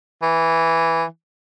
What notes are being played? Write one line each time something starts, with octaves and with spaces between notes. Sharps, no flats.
E3